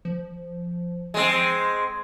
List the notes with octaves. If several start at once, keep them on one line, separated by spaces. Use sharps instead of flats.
F3
G#3 C4